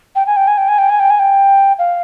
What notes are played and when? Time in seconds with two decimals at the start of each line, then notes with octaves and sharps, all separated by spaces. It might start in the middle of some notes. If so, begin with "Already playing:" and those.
0.16 G5
0.27 G#5
0.37 G5
0.48 G#5
0.58 G5
0.68 G#5
0.79 G5
0.89 G#5
1.00 G5
1.10 G#5
1.19 G5
1.79 F5